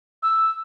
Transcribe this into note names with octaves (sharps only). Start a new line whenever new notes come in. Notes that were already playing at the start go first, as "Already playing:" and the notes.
E6